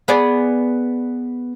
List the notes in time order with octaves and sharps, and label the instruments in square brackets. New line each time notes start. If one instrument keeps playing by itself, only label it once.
[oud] B3 G#4 D5